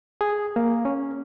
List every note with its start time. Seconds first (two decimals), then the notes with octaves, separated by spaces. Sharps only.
0.21 G#4
0.56 A#3
0.85 C#4